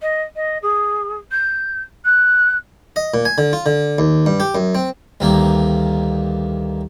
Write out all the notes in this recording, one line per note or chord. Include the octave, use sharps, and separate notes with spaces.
D#5
D#5
G#4
G6
F#6
D#5
A#2
G#5
D3
F4
D3
D#2
G2
G4
F#2
C4
D2 G2 D#3 A#3